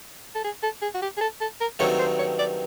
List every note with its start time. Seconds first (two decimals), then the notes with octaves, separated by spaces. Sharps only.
0.35 A4
0.44 G#4
0.63 A4
0.82 G#4
0.94 F#4
1.02 G4
1.17 G#4
1.21 A4
1.41 A4
1.60 A#4
1.79 G2 D#3 F#3 A3 C4 C#5
1.99 C5
2.19 C#5
2.39 D5